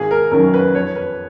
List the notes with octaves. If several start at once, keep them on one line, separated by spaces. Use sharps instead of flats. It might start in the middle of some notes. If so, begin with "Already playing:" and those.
Already playing: G#1 G#4
A#4
F#2 D#3 F#3 A#4
B4
F2 C#5
B4